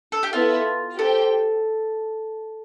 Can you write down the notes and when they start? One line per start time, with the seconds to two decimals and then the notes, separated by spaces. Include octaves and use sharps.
0.12 A4
0.23 G4
0.33 B3 E4 F4 A4 E5
0.98 G4 A4 C5 G5